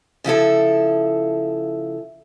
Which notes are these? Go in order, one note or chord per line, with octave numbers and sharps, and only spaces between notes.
C#3 F3 E4 A4